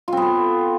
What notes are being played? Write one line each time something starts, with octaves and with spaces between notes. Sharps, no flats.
B3 C4 F4 A4